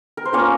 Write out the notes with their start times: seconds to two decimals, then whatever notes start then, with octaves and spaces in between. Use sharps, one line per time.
0.17 A#4
0.25 C5
0.33 A#3 C#4 F4 C#5